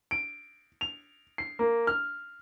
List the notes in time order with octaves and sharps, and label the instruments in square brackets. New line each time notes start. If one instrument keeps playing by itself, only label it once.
[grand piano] D7
F7
C7
A#3
F6